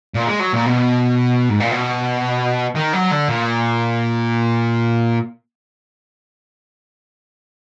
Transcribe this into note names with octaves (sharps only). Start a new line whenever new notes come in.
A#2
G#3
F#3
A#2
B2
G#2
A#2
B2
D#3
F#3
D3
A#2